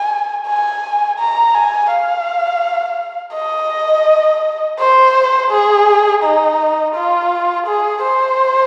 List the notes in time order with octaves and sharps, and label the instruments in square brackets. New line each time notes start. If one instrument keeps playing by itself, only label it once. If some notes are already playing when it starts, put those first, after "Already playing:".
Already playing: [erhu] G#5
G#5
A#5
G#5
F5
D#5
C5
G#4
D#4
F4
G#4
C5